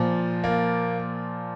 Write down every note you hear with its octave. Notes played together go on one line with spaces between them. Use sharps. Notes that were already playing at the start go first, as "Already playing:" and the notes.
Already playing: A#2 F3
A#3